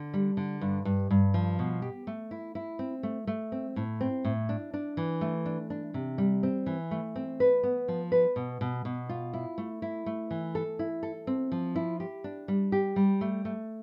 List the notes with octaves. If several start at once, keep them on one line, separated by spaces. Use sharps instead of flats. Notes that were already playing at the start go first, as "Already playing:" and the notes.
Already playing: D3
G3
D3
G2
G2
G2
F3
B2
G4
A3
E4
E4
C4
A3
A3
C4
A2
C4
A2
D4
D4
E3
A3
D4
D4
C3
G3
C4
E3
A3
C4
B4
B3
F3
B4
B2
B2
B2
F4
E4
A3
E4
A3
E3
A4
E4
A4
C4
F3
E4
G4
D4
G3
G4
G3
A3
A3